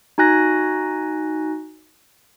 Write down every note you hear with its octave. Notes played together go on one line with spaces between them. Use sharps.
D#4 F#4 G#5 F#6 A#6